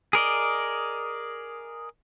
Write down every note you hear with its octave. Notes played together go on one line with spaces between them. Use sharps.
G#4 A#4 D5 D#5